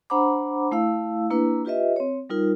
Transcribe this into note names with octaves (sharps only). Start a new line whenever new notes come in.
D4 C5 F#5 A#5 B5 D6
A3 E4 F5 E6
A#3 D4 E4 B4
F4 G4 B4 D#5 E5
C4 C#5
G3 D#4 F4 A#4